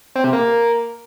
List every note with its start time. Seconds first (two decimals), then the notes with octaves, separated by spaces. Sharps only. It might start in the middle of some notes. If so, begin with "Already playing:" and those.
0.16 C4
0.24 C3
0.33 A#3